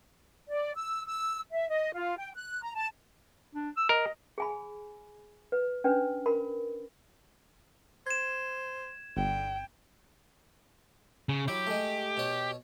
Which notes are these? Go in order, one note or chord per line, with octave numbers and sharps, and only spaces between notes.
D5
E6
E6
E5
D#5
F4
G5
F#6
A#5
A5
D4
E6
A#4 D#5
G#4 G#5 B5
B4
C#4 D4 B4
A#4 B5
C5 G#6 E7
G1 D3 G5
C#3
F#3 E4 G4
G#3 A3
B2 C#5